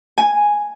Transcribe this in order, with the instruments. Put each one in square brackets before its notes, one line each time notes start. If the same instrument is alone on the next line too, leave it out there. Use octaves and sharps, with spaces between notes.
[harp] G#5